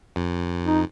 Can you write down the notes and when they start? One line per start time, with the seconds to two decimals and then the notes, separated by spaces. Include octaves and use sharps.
0.16 F2
0.65 D#4